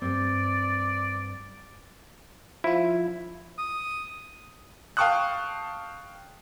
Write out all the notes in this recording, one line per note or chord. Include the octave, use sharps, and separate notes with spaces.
G2 C4 D5
F3 E4 F4
D#6
F5 G5 A5 C#6 D#6 F#6